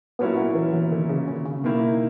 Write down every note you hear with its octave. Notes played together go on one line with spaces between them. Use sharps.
A#2 F#3 A#3 B3 C#4 E4
B3
E3
E3
D#3
C#3
C#3
C#3
B2 D#3 A#3 E4